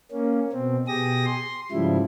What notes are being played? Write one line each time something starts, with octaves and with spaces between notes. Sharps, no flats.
A#3 C#4
B2 C4
B2 G4 G#4 D#6 A#6
C6
G#2 C#3 F3 G3 E4